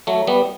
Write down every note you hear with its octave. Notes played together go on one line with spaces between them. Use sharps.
F#3 A3
G3 B3